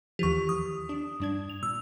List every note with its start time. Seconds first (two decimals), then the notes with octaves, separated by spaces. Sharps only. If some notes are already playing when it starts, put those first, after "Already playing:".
0.19 D#2 E3 F3 G4 C#6
0.49 D#6
0.89 D4
1.20 G2 D4 G#6
1.50 F7
1.63 A#2 E6